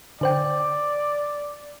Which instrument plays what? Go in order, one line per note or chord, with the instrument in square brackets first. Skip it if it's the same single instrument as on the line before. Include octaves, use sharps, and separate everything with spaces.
[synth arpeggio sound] D3 C5 G5 [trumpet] D5